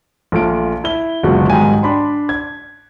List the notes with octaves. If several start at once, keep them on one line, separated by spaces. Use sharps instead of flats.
A#1 A3 F4 D7
E4 G7
F#1 D2 B2 G#3 F4 F#5
B1 G#2 D#3 G3 G#5
D4 B5 C6
G#6